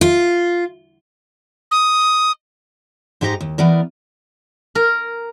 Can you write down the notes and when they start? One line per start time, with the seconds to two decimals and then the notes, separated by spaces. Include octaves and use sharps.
0.01 F4
1.71 D#6
3.21 G#2 G#3 D#4 G4 B4 A#5
3.41 D#2
3.58 E3 B3 A#4 D5
4.75 A#4